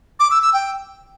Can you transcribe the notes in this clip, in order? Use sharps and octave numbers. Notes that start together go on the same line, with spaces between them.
D6
E6
E6
G5